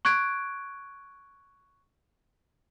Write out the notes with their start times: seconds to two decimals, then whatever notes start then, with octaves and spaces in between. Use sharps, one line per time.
0.05 C#6 F#6 G#6 D7